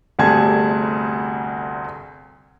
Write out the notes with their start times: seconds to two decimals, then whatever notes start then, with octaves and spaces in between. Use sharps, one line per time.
0.19 G1 D2 C3 G#4 A5 G#6